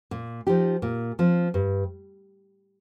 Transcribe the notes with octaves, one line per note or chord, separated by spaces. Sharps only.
A#2
F3 D#4 G4
A#2
F3 C4
G2